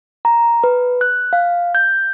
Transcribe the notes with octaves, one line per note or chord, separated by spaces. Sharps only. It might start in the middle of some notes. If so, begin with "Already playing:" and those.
A#5
B4
F#6
F5
G6